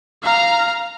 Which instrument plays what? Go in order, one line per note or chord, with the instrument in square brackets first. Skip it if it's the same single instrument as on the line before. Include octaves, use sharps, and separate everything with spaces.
[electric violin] F5 A#5